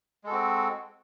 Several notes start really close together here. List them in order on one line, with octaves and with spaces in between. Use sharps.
G#3 A4 F#4 C4